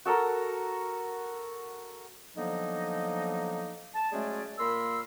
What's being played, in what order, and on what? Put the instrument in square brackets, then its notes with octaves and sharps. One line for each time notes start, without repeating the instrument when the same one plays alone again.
[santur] F#4 A4 A#4
[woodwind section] D3 F3 F#3 A#3 B3 D#4
A5
F#3 G#3 A3 C#4 G#4 D5
A#2 A#3 A#4 B5 C6 E6